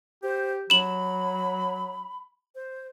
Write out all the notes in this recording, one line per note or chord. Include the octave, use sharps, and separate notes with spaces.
G4 C5
F#3 B5 E7 F#7
C5